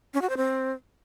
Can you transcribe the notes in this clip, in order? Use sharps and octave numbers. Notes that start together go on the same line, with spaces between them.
C#4
F#4
C5
C4